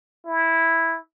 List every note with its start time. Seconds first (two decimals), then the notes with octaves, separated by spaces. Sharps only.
0.26 E4